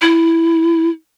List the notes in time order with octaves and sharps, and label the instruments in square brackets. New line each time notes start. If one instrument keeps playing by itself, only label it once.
[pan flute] E4